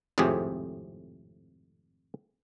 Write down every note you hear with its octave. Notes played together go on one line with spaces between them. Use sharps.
G#1 F2 A2 C3 G4 G#4